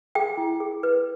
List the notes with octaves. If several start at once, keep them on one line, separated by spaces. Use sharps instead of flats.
G#4 G5
E4
G#4
B4